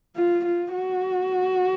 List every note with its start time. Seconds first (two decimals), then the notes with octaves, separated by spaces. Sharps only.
0.16 F4
0.45 F4
0.74 F#4